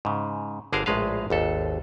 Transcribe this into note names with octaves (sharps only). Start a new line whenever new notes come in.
G#2 C#3
G1 D3 G#4 A#4 C5 F5
A#1 A2 G#3 B4 F5
G#1 D#2 A4